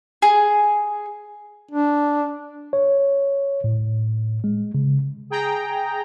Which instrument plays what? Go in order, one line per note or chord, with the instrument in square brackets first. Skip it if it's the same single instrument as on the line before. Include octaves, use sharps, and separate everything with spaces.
[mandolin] G#4
[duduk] D4
[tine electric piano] C#5
A2
G#3
C#3
[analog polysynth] G#4 G5 A#5